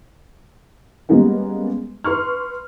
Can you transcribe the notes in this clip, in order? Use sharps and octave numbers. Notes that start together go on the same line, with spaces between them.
G3 G#3 A#3 B3 C#4
B4 C6 C#6 F6